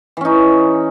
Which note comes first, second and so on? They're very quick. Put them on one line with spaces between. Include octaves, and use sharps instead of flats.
E3 C#4 D#4